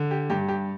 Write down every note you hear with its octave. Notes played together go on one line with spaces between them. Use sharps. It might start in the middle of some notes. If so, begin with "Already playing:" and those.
Already playing: D3
G4
G2 G4
G4